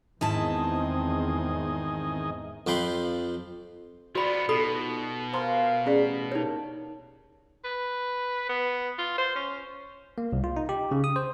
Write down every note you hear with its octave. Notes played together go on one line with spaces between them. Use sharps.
E2 G#2 D#3 C4 E4 G#4 D#5 A5
F2 F3 G5 B5 C6
F3 B3 F#4 D5 B5
B2 D#4 F4 G4 A4 B5
G4 A#4 C5 F5 A#5 C6
A1 C#4 G#4 D5
A#3 D#4 G4 C#5
B4
B3
F4
C5
C#4
A#3
C2
F4
D#4
G4
C#3
D#6
C5